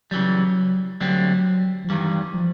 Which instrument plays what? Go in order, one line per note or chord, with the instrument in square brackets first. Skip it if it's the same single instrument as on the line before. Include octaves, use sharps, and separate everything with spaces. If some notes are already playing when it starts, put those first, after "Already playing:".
[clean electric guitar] C#3 E3 G3 [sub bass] F#3
[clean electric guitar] D2 D3 G3 C4 [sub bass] F#3
[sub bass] F3
[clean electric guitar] G2 D#3 G3 [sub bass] E3
[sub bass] F3